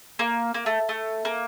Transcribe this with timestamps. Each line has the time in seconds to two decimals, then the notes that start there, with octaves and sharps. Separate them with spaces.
0.19 A#3
0.54 A#3
0.66 A3
0.89 A3
1.25 A#3